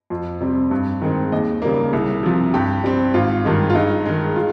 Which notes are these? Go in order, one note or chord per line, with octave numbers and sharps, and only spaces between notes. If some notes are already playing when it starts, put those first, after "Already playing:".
F2
C3 G3 C4
G2
D#3 G#3 C4
D#2 D#5
C#3 G3 A#3
C2
C3 F3
G2 G4
G3 C4
G#1 F4
G2 D#3 G#3
F4
G2 D#4
D#3 G#3
F4